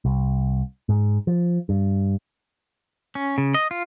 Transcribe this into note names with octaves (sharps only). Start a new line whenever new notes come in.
C2
G#2
F3
G2
C#4
C#3
D#5
F4